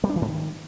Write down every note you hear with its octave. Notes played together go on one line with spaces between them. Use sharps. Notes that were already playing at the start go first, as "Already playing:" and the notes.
G3
D4
E3
G#2
D#3